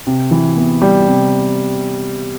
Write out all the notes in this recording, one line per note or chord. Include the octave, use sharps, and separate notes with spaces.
C3
E3
B3
G3
C3